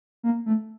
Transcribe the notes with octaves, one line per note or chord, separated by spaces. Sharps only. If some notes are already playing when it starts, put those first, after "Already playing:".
A#3
A3